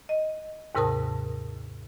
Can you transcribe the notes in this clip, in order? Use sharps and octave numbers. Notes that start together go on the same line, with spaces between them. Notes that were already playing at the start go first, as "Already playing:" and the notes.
D#5
D#2 G#2 C3 A#4 A5 D#6